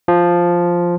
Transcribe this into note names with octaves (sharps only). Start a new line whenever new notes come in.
F3